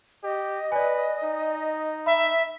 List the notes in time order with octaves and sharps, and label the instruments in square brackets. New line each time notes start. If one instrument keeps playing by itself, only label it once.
[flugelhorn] G4 [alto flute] D#5
[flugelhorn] B4 [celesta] D5 G#5
[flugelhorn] D#4
[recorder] E5 [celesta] B5